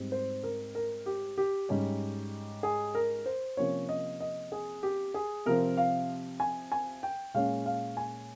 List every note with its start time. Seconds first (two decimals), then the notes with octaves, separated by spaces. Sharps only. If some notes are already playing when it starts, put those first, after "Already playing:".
Already playing: G#2 G3 C4
0.12 C5
0.43 A#4
0.75 A#4
1.06 G4
1.38 G4
1.69 G#2 G3 C#4
2.63 G#4
2.95 A#4
3.26 C5
3.57 C3 F3 A#3 C#4 C#5
3.89 D#5
4.20 D#5
4.52 G#4
4.83 G4
5.14 G#4
5.46 C3 F3 C4 A#4
5.77 F5
6.40 G#5
6.72 G#5
7.03 G5
7.34 A#2 G#3 C#4 F5
7.66 F5
7.97 G#5